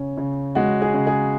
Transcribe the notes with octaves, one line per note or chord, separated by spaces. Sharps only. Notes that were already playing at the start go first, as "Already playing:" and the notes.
Already playing: C#3 C#4
C#3
G#3 F#4
G#4
C#3
G#4